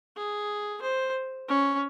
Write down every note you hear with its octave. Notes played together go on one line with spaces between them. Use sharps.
G#4
C5
C#4